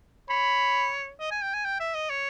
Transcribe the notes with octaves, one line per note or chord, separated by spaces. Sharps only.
C#5 B5
D#5
G#5
G5
G#5
G5
E5
D#5
C#5